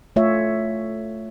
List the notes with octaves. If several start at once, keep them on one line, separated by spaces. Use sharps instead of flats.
A3 F4 C#5 E5